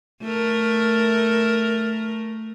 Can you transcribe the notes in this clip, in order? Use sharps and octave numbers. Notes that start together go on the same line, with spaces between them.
A3 A#4